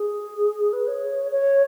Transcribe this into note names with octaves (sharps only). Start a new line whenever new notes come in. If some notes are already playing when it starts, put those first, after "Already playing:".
Already playing: G#4
B4
C#5
C#5